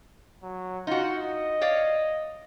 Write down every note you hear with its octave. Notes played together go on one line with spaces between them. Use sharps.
F#3
D#4 F4 F#4
D#5
C#5 D5 F5